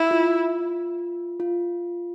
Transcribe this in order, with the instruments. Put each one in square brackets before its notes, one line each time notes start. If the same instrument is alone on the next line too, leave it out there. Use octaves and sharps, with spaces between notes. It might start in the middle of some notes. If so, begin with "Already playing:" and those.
Already playing: [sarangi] E4
[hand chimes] F4
F4